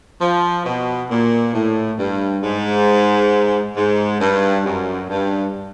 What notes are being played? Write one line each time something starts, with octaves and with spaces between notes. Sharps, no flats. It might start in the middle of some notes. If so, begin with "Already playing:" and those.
F3
B2
A#2
A2
G2
G#2
G#2
G2
F#2
G2